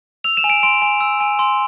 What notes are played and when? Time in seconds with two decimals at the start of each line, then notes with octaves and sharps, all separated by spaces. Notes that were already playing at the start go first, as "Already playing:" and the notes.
0.24 E6 F7
0.37 E7
0.44 G#5
0.50 D7
0.63 C6 D7
0.82 G#5
1.01 E6
1.20 G#5
1.39 C6